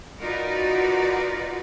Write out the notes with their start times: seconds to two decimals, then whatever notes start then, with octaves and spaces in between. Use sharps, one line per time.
0.21 D#4 F4 F#4 A#4 B4 D5